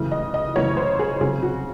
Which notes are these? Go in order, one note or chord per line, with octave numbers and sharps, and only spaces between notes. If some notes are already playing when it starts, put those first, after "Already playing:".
Already playing: F#2 C#3 E3 A3
D#5
D#5
F#2 C#3 E3 A3 C#5
C5
G#4
C#3 F#3 C4 G#4
F#4